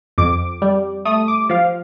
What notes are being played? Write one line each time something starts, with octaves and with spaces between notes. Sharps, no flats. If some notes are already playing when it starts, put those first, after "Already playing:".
F2 D6
G3
A3 D#6
D6
F3 F5